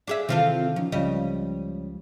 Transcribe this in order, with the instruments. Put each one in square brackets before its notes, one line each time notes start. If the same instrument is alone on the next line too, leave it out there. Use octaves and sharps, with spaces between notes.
[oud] D4 G#4 E5
[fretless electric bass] C3 D#3 E3 [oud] C4 F4 A4
[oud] D#3 [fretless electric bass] F3 C#4
[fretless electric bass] C#2 F3 [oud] C#3 G3 D#5